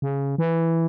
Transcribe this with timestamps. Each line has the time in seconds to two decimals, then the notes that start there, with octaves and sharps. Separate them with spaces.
0.02 C#3
0.38 E3